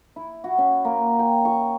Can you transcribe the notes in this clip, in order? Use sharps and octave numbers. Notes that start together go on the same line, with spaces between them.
E4
F#4
C#4
A#3
G5
C#6